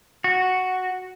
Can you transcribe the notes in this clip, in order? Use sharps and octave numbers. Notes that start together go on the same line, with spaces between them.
F#4